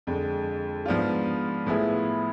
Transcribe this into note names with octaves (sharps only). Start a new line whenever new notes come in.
F2 D3 G#3
G#2 F3 B3 D4 F4
A2 F3 B3 E4 G#4